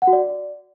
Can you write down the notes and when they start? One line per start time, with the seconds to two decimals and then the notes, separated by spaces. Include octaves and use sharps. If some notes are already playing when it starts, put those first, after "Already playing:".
0.02 F#5
0.07 F#4
0.13 D5